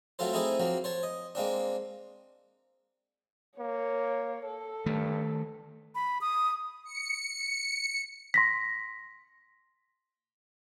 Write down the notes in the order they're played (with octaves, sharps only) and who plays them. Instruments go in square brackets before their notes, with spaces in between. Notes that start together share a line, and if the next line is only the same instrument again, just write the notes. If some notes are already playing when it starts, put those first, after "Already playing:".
[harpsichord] F#3 A3 C4 F4 A4 C5
A3 C4 D#4 E4 G#4 A4
F3 F#3 A#3 C4
C5 C#5 A5
D#5
G#3 A#3 C4 D4
[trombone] A#3 [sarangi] C#5
[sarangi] A4
[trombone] G2 [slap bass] D#3 A3
[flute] B5
D#6
[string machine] C#7
[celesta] C6 A#6 B6